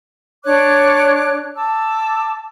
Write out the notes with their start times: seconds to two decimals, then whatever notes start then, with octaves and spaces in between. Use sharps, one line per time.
0.44 D4 C#5 D6 F#6
1.55 A5 D6 E6